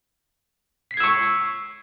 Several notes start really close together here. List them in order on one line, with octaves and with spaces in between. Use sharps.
B6 C7 G#6 E6 C#6